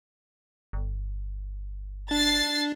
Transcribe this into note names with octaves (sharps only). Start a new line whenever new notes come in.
G1
D4 A6 C7